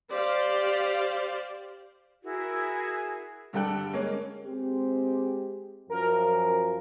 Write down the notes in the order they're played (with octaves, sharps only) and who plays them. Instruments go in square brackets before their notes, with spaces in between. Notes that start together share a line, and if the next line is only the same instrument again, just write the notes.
[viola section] G4 C5 D5 F5
[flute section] E4 F#4 G#4 A#4
[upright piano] G2 D3 G3 A4 G5 F#6
G#3 A#3 C#4
[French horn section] G#3 C4 G4
[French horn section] F#2 F3 [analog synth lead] A#4